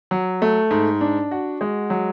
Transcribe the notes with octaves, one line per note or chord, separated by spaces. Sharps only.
F#3
A3
G#2
D4
F#4
G#3
F#3